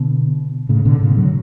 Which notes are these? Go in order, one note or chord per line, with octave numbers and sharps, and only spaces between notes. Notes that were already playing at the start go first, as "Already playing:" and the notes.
Already playing: B2 D3
A2 C#3
B2 D3
A2 C#3
D3 F#3